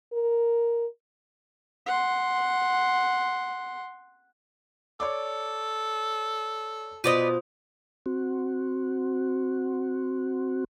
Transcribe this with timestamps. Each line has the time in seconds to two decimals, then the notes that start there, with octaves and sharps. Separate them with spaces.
0.13 A#4
1.86 F#5 C6
5.00 A4 C#5 D5 D6
7.04 B2 F4 B4 C5 D5 D#5 D#6
8.06 C4 F#4